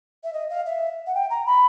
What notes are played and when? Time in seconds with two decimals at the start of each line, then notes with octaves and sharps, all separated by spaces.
0.24 E5
0.33 D#5
0.50 F5
0.66 E5
1.07 F#5
1.15 G5
1.30 A#5
1.46 B5